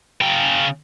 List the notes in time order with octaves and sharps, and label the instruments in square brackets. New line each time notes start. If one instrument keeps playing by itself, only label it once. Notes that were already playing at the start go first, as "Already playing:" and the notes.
[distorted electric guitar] C#3 G5